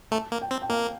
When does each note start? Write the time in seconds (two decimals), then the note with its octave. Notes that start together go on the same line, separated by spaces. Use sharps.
0.12 A3 A5
0.32 A#3
0.42 G5
0.51 C4
0.62 G5
0.70 A#3 F5